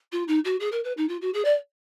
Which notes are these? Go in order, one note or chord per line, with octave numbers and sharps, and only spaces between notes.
F4
D#4
F#4
G#4
A#4
B4
D#4
F4
F#4
G#4
D5